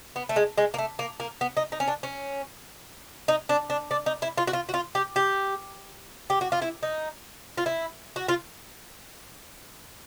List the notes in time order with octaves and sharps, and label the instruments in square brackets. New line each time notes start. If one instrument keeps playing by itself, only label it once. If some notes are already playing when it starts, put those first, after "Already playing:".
[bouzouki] B3
A3
G#3
G#3
A#3
A3
A#3
A#3
B3
D#4
D#4
C#4
D4
C#4
D#4
D4
D4
D4
D#4
E4
F4
F#4
F4
F#4
F4
G4
G4
G4
F#4
F4
E4
D#4
F4
E4
F#4
F4